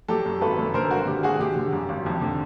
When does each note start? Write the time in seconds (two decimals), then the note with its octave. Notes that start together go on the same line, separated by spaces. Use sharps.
0.08 F#3 G4 A4
0.26 F#2
0.41 G#1 A4 B4
0.59 F#2
0.74 D3 A#4 C5
0.91 G#1 F#4
1.07 D3 G4
1.23 G#1 F#4 G#4
1.40 D3 G4
1.56 D3
1.72 F#2
1.89 G#1
2.06 F2
2.21 D3